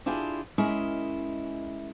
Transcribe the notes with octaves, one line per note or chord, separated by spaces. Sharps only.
D4 E4 F4 G4 G#4
G#3 C#4 E4 G#4 A#4 D#5